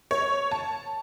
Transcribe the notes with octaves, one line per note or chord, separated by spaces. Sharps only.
C#5
A5